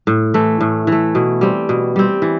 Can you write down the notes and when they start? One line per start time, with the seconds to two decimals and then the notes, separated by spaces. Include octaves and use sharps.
0.07 A2
0.34 E3 A3
0.61 A2
0.87 E3 A3
1.15 B2
1.41 G3 C4
1.69 B2
1.96 G3 C4
2.22 E3